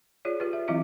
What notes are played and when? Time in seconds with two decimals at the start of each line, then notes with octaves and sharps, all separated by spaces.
0.25 F4 G#4 C#5 D5
0.40 F4 G4 B4
0.53 E5
0.68 E3 F#3 C4 E4 D#5 E5